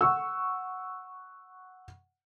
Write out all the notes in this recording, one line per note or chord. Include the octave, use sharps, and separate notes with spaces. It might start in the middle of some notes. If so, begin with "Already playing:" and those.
F#5 C#6 E6